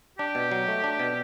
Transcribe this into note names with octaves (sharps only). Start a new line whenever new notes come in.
D4 G4
B2
F#3
A3
D4
B2